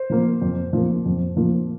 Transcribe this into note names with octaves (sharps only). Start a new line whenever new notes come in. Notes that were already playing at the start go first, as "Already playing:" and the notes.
Already playing: C5
F3 A#3
F2
F3 A#3
F2
F3 A#3